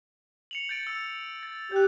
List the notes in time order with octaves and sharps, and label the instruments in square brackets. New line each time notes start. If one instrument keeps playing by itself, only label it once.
[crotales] C#7 F7 F#7
G6 A6 D7
E6
A6
[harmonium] G4 [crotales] F#6 G6